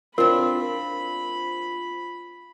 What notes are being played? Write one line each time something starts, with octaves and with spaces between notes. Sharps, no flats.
C4 D4 F4 A#4 B5